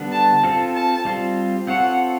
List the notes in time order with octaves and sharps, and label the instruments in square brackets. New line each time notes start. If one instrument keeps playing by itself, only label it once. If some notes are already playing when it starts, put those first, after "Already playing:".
Already playing: [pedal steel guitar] D3 G3 B3 D4
[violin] A5
[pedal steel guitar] C4 F4 A4
[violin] A5
[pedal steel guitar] G3 C4 F4
[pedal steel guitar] C4 F4 A4 C#5 [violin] F#5